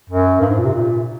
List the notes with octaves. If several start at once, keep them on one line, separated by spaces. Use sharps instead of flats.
F#2
G2
G#2
A#2
C3
A#2